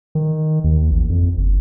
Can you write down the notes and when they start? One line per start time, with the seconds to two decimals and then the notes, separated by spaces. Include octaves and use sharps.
0.15 D#3
0.64 D#2
0.91 A1
1.10 F2
1.38 F#1